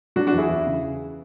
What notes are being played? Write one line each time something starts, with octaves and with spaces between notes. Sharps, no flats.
F#3 D4 F#4
D4 F#4
E2
E4 G#4
E2
C#3